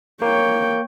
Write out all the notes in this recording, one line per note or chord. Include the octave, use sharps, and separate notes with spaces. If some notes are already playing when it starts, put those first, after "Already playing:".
A#3 C#5 G5